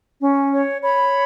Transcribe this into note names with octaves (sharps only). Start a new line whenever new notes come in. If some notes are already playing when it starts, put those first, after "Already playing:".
C#4
C#5
C#5 B5